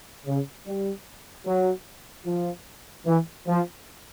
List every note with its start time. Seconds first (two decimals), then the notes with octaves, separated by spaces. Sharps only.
0.26 C#3
0.67 G3
1.46 F#3
2.26 F3
3.06 E3
3.47 F3